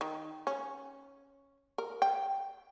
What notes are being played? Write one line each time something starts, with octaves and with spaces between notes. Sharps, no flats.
D#3
C#4
A#4
G5